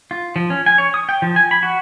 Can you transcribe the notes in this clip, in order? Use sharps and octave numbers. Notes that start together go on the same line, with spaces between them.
F4
F3
C#4
G#5
C#5
D#6
G5
F3
G#5
B5
F#4